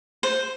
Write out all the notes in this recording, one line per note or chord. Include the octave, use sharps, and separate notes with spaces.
C5